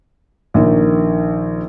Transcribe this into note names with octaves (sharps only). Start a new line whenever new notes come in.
A#1 D#3